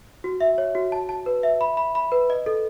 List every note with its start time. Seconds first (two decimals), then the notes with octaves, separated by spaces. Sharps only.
0.24 F#4
0.41 E5
0.58 C#5
0.75 F#4
0.92 A5
1.09 A5
1.26 B4
1.43 E5
1.61 B5
1.77 B5
1.95 B5
2.12 B4
2.30 D#5
2.46 A4